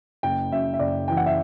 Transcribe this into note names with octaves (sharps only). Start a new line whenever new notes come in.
F#1 G5
F#2 E5
E5
F#1 D5
E3 G5
F#5
E5